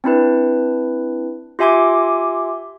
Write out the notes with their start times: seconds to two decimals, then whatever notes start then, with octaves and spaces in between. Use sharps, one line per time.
0.04 C4 D4 E4 B4
1.59 F4 G4 E5 G#5 C6 D6